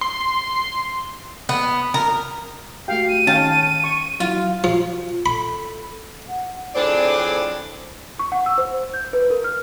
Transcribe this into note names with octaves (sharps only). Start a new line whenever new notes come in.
C6
B3
A#4
A3 F#4 G4 F5 G5
D#7
D#3 C#4 F5 G5 A5
C#6
F#3 E4 F4
F3 F4
A4 B5
F#5
F2 A2 C4 D4 G#4 D5
C#6
F#5
E6
C5
G6
B4
A#4
F6